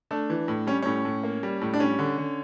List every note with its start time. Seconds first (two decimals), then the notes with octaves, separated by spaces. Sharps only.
0.11 A3 D4
0.30 E3
0.48 A2
0.67 G3 C#4
0.82 A2 C#4
1.05 A2
1.23 A#3
1.43 G3
1.62 A2
1.74 D4
1.80 G3 C#4
1.99 D3
2.18 D3